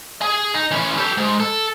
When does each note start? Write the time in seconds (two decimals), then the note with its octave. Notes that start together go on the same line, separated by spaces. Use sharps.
0.21 G#4 G#5
0.54 D#4
0.71 E3 C#4
0.97 G4 A4
1.17 G#2
1.40 A4